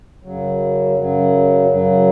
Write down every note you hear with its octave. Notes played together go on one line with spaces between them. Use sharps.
F#2 C#3 F#3
F#2 C#3 F#3
F#2 C#3 F#3